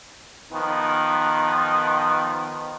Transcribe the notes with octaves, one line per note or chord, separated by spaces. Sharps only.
D#3 F3 B3